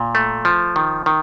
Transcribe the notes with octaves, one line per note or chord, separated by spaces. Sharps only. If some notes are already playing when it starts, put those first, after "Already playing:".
Already playing: A#2
A3
F3
D#3
D#3